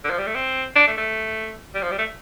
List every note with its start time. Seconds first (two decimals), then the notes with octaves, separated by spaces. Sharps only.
0.05 D3
0.11 F3
0.19 G3
0.27 A3
0.35 C4
0.76 D4
0.87 A3
0.98 A3
1.75 G3
1.82 F3
1.91 G3
1.99 A3